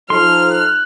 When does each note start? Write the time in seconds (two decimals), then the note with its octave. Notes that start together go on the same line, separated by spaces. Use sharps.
0.10 F3 D#4 A4 C6 F6
0.50 F#6